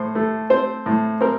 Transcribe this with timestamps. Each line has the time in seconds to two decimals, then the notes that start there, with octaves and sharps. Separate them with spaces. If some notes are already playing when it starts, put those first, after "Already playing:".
Already playing: A2 C5
0.15 A3
0.50 C4 C5
0.86 A2
1.21 C4 A#4